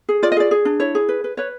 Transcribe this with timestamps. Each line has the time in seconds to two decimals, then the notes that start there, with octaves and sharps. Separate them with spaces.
0.09 G#4
0.23 F4 D5
0.32 D#5
0.37 G#4 D5
0.51 G#4
0.65 D4
0.80 E4 C#5
0.95 G#4
1.09 B4
1.24 B4
1.37 B4 C#5